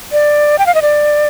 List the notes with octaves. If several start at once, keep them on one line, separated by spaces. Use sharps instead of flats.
D5
G5
F5
D#5
D5